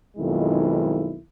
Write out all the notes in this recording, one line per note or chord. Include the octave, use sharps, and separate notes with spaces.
B1 F2 D#3 F3 G#3 E4